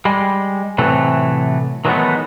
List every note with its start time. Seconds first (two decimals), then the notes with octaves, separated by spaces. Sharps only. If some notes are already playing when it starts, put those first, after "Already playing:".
0.05 G3 G#3
0.78 A2 C3 E3 F#3 A3
1.85 D#3 E3 F#3 G#3 A3 B3